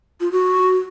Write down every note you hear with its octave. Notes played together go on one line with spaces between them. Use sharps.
F4
F#4